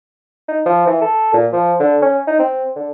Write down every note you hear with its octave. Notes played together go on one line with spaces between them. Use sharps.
D#4
F3
E3
A4
A#2
F3
D3
C#4
D#4
C4
D3